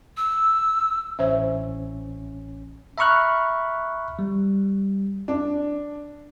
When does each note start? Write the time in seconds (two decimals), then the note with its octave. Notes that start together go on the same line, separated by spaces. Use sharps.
0.17 E6
1.19 A1 C#4 C5 E5
2.98 E5 A#5 B5 C#6 F6 F#6
4.19 G3
5.28 D4